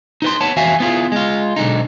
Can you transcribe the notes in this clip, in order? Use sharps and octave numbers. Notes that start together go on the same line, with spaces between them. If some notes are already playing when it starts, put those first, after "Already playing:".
D#4 B4 C6
B3 C#5 A5
F2 E3 F#4 E5 F5 G#5
B3 E4 F4 G#4
G#3 F4
B1 D3 G#3 D#4